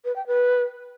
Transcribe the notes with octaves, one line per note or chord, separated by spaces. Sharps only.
B4
G5
B4